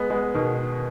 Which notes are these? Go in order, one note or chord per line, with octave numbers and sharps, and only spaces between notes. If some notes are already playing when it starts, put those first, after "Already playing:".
Already playing: G#3 B3
G#3 B3
B2 D#3